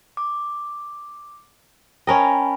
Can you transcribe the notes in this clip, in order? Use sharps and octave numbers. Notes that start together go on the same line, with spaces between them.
D6
C#4 A#4 D#5 G5 A5 B5